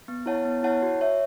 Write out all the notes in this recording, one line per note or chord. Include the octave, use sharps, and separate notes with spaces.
B3
E4 C#5 F#5 A5
B3
E4 C#5 F#5 A5
F#4
C#5 E5